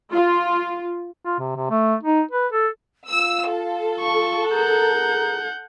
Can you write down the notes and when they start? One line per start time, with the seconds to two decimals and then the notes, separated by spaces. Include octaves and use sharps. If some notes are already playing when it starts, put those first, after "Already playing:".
0.12 F4
1.26 F4
1.39 C3
1.56 C3
1.71 A3
2.04 D#4
2.31 B4
2.52 A4
3.10 F4 F5 E6
3.50 A4
4.00 C#6
4.49 G#4 A#4 F#5 A#5 G6